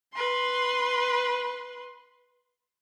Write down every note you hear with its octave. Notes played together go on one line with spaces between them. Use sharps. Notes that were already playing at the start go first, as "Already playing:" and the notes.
B4 C6